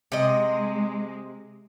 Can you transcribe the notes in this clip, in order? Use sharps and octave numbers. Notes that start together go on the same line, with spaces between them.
C3 G#3 D#5